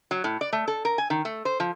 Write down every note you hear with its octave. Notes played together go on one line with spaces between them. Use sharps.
F#3
A2
D5
A3
A4
A#4
G#5
D#3
A3
C5
F3